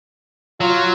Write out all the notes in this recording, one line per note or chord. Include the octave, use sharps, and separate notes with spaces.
F#3 F4